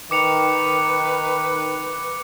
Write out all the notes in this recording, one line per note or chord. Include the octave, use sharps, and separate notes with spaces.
D#3 B4 D6 C#7 F7